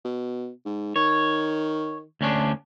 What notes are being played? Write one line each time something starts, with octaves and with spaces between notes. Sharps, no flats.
B2
G#2
D#3 C#5
D2 C#4 D4